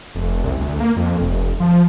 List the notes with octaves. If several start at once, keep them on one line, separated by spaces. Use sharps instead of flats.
F1
C2
D2
A#3
F2
F1
F3